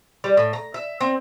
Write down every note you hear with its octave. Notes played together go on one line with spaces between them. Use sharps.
G3
A2
A#5
E5
C4